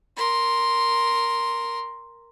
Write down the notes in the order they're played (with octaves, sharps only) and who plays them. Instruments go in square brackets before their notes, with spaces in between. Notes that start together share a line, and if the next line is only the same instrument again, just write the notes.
[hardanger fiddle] A#4 C6